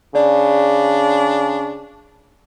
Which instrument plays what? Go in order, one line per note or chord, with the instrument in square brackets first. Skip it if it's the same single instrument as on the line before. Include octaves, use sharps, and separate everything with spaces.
[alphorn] C#3 [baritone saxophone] D4 [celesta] D5